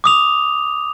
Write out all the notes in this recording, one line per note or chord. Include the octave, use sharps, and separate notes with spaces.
D6 D#6 F7